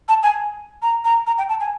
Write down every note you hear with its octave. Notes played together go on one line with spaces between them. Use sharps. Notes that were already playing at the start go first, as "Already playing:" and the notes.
A5
G#5
A#5
A#5
A#5
G5
A5
G#5